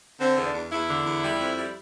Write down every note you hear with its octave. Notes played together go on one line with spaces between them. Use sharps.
D3 C4
E2
D4
E2
E2 E4
D3
E2
G3
F2
G3